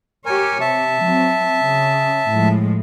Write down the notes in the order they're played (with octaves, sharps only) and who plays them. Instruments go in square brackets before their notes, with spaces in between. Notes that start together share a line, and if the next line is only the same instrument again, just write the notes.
[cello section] G4 C#5 [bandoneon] A#4 G#5
[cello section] C3 [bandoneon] E5 A5
[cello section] F#3 C4
C#3
A2 F3 G#3